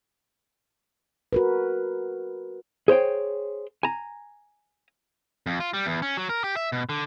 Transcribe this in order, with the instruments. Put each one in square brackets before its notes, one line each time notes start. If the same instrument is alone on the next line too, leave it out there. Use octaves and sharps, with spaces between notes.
[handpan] F#4 A#4 B4
[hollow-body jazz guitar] G#4 C5 C#5 G5
G#5 A#5
[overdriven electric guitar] F2
F4
G3
E2
C#4
F#3
A#4
G4
E5
B2
D3